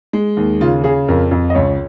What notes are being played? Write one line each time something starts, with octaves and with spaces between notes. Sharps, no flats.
G#3
D#2
C#3 F4
C#3 G#4
F2 A#4
F2
D#5
C#2 C#5